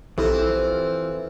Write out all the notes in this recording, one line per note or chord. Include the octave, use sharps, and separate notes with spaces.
A#1 E3 C4 E4 F4 G4 A4